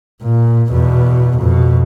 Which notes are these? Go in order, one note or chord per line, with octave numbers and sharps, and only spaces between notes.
A#2
E2 B2
F2 B2